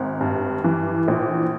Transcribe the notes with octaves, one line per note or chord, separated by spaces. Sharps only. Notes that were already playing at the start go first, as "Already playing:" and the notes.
Already playing: G#1
G2
E3
A#1